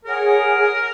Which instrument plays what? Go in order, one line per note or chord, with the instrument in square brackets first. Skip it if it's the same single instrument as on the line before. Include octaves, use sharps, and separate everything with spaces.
[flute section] G#4 C#5 F#5 [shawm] A#4